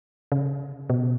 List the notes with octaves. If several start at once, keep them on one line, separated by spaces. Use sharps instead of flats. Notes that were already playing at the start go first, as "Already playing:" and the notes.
C#3
B2